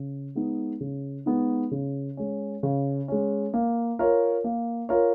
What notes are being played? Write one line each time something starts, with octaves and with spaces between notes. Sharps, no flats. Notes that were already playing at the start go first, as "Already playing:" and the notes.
Already playing: C#3
G#3 B3 D#4
C#3
G#3 B3 D#4
C#3
G#3 C#4
C#3
G#3 C#4
A#3
F4 A#4 C#5
A#3
F4 A#4 C#5